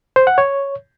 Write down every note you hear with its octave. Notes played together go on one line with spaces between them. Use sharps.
C5
F#5
C#5